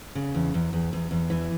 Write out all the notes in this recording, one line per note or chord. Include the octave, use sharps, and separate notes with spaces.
C#3
E2
E2
E2
E2
E2
E3